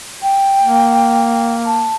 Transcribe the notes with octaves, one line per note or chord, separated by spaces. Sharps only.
G5
A#3
A5